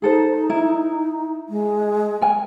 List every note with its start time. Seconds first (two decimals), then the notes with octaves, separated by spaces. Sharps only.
0.02 D#4 G#4 A4 C5
0.50 E4
1.49 G#3
2.21 A#4 G#5